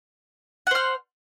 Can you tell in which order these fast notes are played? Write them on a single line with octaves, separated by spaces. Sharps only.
F#5 C5 F6